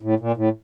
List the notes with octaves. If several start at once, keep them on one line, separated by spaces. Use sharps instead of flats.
A2
A#2
A2